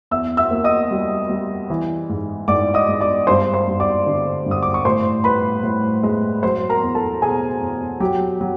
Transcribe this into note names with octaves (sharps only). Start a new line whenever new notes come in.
E2 E5 E6
E5 E6
A#3
D#5 D#6
G3
G3
E3
G#2
G#2 D5 D6
D#5 D#6
G#2
D5 D6
G2 C5 C6
C5 C6
G2
D5 D6
D3
G2
D#6
D6
C#6
A2 C5 C6
A2 B4 B5
A2
G#3
F#3 C5 C6
A#4 A#5
E2
A4 A5
B2 G#4 G#5
E2
F#3 G4 G5
F#3